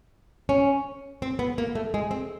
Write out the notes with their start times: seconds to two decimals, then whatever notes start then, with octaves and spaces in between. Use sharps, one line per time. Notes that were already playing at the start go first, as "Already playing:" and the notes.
0.49 C#4
1.22 C4
1.39 B3
1.58 A#3
1.75 A3
1.94 G#3
2.11 C4